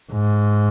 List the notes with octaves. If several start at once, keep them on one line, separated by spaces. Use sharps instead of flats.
G#2